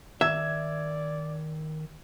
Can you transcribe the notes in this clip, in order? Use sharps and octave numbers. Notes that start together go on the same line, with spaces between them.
D#3 D5 E5 E6 G#6